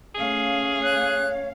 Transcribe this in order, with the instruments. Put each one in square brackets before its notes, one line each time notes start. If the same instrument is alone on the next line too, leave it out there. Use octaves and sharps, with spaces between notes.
[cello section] A3 C#4 F5 [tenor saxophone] G#4
[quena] C#5 [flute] F#6